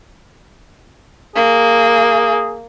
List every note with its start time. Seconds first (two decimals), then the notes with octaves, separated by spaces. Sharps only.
1.35 A#3 G#4